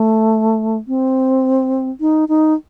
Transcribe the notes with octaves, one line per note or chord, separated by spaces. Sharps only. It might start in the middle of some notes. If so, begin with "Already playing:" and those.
Already playing: A3
C4
D#4
D#4